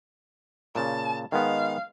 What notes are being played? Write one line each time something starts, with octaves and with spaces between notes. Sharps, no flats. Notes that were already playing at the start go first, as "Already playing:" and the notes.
A#2 C#3 A5
D#3 G#3 B3 F5